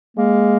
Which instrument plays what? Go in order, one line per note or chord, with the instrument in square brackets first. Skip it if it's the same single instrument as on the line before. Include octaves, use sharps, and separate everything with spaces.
[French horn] G#3 [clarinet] A#3